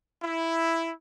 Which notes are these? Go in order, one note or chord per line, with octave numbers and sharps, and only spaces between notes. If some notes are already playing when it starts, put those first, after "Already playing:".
E4